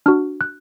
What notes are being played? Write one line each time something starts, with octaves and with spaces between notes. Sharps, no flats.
D4 F#4 F6
F#6